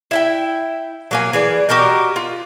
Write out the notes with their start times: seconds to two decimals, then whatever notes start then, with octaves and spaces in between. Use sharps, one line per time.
0.11 E4 E5 G5
1.11 F#3 A#3 G#5
1.33 E3 G#4 D5
1.69 F#4 G4 A#4 D#5
2.16 F4